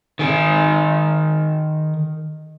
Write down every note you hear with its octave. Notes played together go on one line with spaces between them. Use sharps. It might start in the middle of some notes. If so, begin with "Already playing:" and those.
D#3 G#4